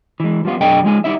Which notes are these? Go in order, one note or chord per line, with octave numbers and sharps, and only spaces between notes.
E3 G#3
F3 G3 B3 F4
B1 F#2 D4 G#4 D#5 G5
F3 G#3 D#4 G#5
G3 D#4 E4 E5